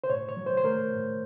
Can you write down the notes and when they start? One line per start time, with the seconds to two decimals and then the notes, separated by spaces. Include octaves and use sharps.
0.04 C5
0.10 A2 C#5
0.29 C#5
0.37 F#3
0.46 C5
0.57 C5
0.64 A3 A#4
0.91 A2